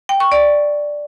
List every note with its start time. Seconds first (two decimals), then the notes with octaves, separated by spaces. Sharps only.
0.09 G5
0.20 C#6
0.32 D5